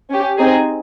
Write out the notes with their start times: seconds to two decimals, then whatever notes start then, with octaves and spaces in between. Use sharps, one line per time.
0.11 C#4 G4
0.39 C4 D#4 G#4